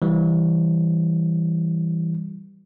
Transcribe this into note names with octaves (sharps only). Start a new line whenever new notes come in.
E3 G3